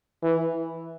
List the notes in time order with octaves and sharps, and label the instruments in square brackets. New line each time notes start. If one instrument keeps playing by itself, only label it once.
[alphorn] E3